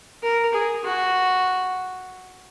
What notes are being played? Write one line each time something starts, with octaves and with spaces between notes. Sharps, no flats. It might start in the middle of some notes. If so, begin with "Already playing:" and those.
A#4
G#4
F#4